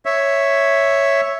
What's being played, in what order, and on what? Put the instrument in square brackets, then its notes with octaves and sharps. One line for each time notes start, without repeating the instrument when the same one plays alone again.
[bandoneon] C#5 E5